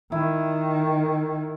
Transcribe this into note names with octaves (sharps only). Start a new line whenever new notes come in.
D#3 E4